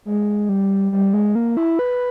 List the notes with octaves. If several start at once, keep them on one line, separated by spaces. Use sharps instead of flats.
G#3
G3
G3
G#3
A#3
E4
B4